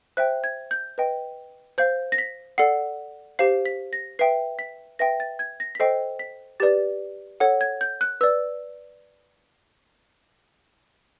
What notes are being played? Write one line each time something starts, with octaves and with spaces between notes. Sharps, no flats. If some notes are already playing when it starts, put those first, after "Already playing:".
C5 E5 G5 F#6
G#6
G6
B4 D#5 G5
C5 F5 G6
A#6
B6
A4 D5 F#5 C7
G4 C5 F5 C7
B6
A#6
B4 E5 G5 C7
B6
B4 E5 G5 A#6
A6
G#6
A#6
B6
A4 C5 D#5 G5 C7
B6
G4 B4 D5 A6
A4 C#5 F#5
G#6
G6
F#6
B4 D5 E6